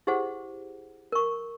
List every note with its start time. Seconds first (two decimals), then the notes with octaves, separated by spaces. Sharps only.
0.07 E4 G4 G#4 C5 F#5
1.12 A#4 C#6